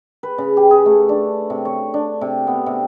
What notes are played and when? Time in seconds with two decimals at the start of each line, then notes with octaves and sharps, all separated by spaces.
0.23 B4
0.38 C#3
0.57 G4
0.71 G#4
0.86 A3
1.09 D4
1.50 C3
1.65 C#5
1.94 D4
2.21 C3
2.47 B3
2.66 C3